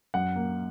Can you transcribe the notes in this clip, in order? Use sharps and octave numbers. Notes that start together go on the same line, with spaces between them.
F#2 F#5
A#3